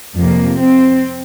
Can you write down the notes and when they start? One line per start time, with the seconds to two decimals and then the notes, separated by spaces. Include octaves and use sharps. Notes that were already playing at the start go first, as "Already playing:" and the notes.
0.18 F2 C3 F3 A#3
0.59 C4